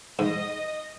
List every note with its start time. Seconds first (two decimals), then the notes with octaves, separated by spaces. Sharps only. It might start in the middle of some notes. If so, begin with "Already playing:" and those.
0.19 G#2 D#5